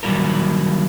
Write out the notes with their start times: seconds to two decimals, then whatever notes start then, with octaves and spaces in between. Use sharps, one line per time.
0.03 D#3 F#3 G3 D#4 E4 A#4